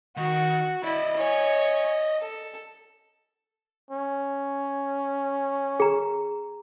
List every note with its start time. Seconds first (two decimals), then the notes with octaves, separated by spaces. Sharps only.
0.17 D#3 F#4
0.84 E4 D5 D#5
1.17 C#5 G#5
2.20 A4
3.91 C#4
5.80 G#4 A#5